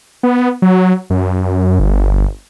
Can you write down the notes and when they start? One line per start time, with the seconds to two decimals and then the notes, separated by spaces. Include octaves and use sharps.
0.23 B3
0.62 F#3
1.10 F#2
1.79 G1